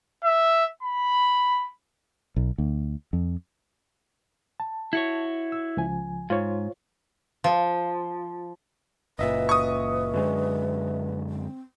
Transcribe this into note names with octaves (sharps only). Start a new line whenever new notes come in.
E5
B5
B1
D2
F2
A5
E4 F#4 C#5
E6
C#2 F3 G#5
G#2 F4 C5 C#5
F3
F#1 A#2 B4 D#5 E5
C#6 D#6
F#2 D3 G#3
C4